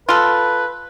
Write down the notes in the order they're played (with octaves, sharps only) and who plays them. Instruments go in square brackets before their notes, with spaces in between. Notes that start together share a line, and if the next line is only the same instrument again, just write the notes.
[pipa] F4 A4 [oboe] B4